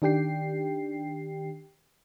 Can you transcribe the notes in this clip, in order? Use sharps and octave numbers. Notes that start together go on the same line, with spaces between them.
D#3 D4 G4 G5 C7